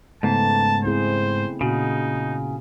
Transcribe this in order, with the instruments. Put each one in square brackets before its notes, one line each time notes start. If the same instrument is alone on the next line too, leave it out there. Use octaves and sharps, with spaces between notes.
[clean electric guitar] G#2 [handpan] C#3 A3 B3 [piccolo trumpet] A5
[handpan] C4 E4 G#4 [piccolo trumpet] C5
[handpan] A#2 F#4 [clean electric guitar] C#3 [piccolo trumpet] D#4